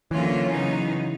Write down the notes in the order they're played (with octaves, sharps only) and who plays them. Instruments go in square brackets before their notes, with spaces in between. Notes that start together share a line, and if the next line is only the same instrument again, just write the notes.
[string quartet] D3 F#3 A#3 C#4 F4 [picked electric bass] E3
[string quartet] C#3 F#3 B3 D#4